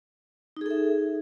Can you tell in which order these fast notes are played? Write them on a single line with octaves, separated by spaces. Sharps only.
D#4 G#4 A4 E5